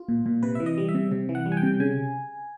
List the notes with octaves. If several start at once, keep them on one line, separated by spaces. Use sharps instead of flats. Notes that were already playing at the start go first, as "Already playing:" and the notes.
Already playing: F4
A#2
A#2
C3 B4
E3 E5
D#5
G3
E5
C3
C3
E3
F#5
G3
G#5
G5
C3
C#3 G#5